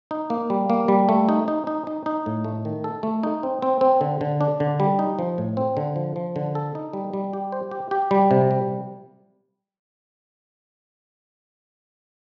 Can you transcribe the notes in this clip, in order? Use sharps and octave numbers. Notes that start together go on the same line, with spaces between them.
D#4
A#3
G3
A#3
G3
A3
D#4
D#4
D#4
D#4
D#4
A2
A3
D#3
A4
A3
D#4
C4
C4
C4
D3
D3
D4
D3
G3
D#4
F3
A2
C4
D3
F3
F3
D3
A4
D#4
G3
G3
G4
C5
G4
G4
G3
C3
G3